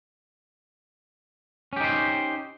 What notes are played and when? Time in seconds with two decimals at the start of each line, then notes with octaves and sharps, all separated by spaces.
1.73 C#4
1.76 G4
1.80 D#4
1.84 C5